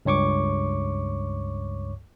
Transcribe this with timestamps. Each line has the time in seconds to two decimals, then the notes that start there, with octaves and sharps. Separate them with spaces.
0.05 C#2 G2 C#5 C#6 D6